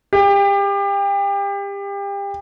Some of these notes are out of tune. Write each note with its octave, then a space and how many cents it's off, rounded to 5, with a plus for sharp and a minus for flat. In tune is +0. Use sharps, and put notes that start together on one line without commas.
G4 +30